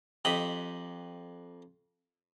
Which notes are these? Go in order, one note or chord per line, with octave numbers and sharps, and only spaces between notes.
F2 G4 D#5 B5